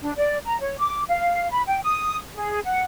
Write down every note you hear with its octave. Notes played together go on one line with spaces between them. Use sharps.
D4
D5
A#5
C#5
D6
F5
B5
G5
D#6
G#4
F#5